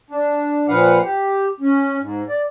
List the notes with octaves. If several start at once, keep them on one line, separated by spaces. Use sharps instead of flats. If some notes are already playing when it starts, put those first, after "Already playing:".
D4
A#2 F3 B4 F5 F#5
G4
C#4
G#2
D5